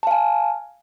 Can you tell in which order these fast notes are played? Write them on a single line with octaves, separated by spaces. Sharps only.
A5 F5 G#5